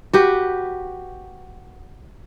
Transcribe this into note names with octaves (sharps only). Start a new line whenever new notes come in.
F#4 G4 B4